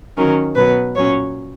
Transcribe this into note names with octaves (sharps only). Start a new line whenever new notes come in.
D#3 F#3 C#4 A#4
B2 F#3 B3 B4
A#2 F#3 C#4 C#5